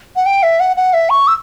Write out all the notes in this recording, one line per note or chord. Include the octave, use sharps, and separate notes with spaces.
F#5
G5
E5
F#5
F#5
E5
C#6
E6